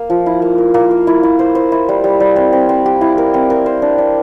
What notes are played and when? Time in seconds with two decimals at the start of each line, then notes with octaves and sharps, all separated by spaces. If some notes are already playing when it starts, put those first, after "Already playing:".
Already playing: A#3
0.10 F3
0.26 E4
0.42 A#3
0.58 A#4
0.74 A#3
0.91 A#4
1.07 E4
1.23 E4
1.39 C5
1.55 C5
1.72 E4
1.89 G3
2.04 G3
2.20 G3
2.36 C4
2.53 C4
2.69 C4
2.86 G4
3.01 E4
3.18 A#4
3.34 C4
3.50 A#4
3.66 C5
3.82 D4
3.98 D4